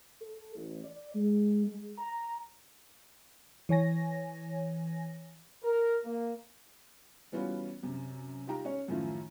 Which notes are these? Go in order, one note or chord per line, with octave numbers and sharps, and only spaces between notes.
A4
A1
D5
G#3
G#3
A#5
E3 C#5 G#5 A#6
A#4
A#3
E3 G3 B3 C#4 F4 F#4
F#2 C3
D#4 F4 G4 G5 A#5
C#4 C#5
F#2 A2 D#3 F3 A3 F4